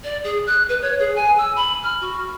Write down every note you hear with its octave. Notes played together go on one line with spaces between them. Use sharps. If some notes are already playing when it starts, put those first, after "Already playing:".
D5
G#4
F#6
B4
C#5
G#4
G#5
E6
B5
F6
F#4